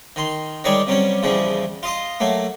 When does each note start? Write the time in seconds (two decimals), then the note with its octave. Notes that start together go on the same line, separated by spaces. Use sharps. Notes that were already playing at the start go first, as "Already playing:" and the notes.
0.16 D#3 C6
0.64 D#3 G3 G#3 C#5 D5
0.87 C3 F#3 G3 C#4
1.23 E2 C#3 E3 F3 G3
1.83 F4 D#5 C6
2.20 F#3 A3 A#3